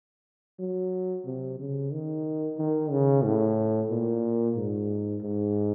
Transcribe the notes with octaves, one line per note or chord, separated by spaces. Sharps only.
F#3
C3
C#3
D#3
D#3
C#3
A2
A#2
G#2
G#2